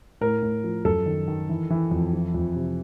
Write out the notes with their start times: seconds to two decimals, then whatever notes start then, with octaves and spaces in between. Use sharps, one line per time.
0.21 A2 A#4
0.43 A2
0.64 F3
0.85 F#2 A4
1.06 D#3
1.28 D#3
1.49 E3
1.70 E3
1.91 F2
2.13 F3
2.34 F2
2.55 C3